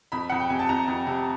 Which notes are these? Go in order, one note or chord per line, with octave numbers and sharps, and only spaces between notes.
F2 B5
F2 F#5
G5
C3 G#5
A5
F2 A#5
F2
C3